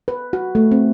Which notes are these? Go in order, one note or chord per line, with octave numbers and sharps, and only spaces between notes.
B4
F#4
A3
C4